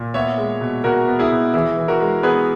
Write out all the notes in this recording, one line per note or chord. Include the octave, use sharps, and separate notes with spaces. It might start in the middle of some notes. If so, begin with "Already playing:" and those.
Already playing: A#2
B3 C#5 E5
G#3
B2
B2 F#4 A#4
B3
E4 G#4
B2
E3 E4 G#4
E3
F#4 A#4
G#3
B3 G#4 B4